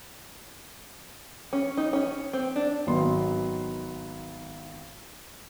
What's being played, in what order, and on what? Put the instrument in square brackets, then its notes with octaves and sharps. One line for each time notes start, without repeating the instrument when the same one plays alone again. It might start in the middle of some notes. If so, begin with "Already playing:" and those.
[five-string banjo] C#4
D#4
C#4
C4
D4
[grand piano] G#1 D#3 F#3 B3 C6